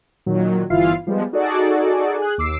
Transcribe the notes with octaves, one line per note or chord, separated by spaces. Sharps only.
A#2 D#3 F#3
G1 E3 E4 F4 F5 C7
F3 G3 G#3 B3
D#4 F#4 G#4 A4 D5
G#4 F#6
D#2 D6 E6 C7